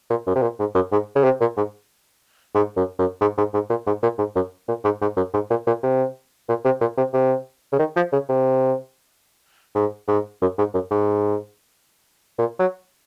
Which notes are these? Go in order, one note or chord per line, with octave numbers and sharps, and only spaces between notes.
A#2
F#2
C3
A#2
G#2
F#2
G#2
C#3
C3
A#2
G#2
G#2
F#2
F#2
G#2
G#2
G#2
A#2
G#2
A#2
G#2
F#2
A#2
G#2
G#2
F#2
G#2
A#2
A#2
C3
A#2
C3
A#2
C3
C3
C#3
D#3
F3
C#3
C3
G#2
G#2
F#2
G#2
F#2
G#2
A#2
F#3